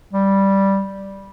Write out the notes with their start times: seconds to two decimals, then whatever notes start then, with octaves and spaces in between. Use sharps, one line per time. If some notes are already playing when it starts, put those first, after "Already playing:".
0.13 G3